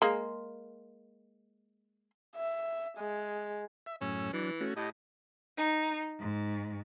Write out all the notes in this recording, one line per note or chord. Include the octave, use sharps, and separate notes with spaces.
G#3 A#3
E5
G#3
E5
F#2 A2 C#4 E6
E3 F#3 D4
A3 C#4 F#4
A2 G4 D#5
D#4
G#2